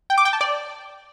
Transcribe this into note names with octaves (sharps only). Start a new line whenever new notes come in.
G5
D6
G5
A5
D5